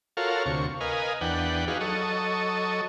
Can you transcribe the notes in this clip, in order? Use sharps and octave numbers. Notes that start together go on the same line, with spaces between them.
F4 F#4 A4 A#4 C#5 F5
D2 C3 C#6
A#4 B4 D#5 F5 G#5
E2 D4 B4 F#5 G5
D#4 F#4 G#4 B4 F5
F#3 A4 D#5 C#6